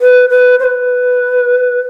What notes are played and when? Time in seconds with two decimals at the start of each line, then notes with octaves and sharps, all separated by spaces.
0.01 B4
0.30 B4
0.60 C5
0.64 B4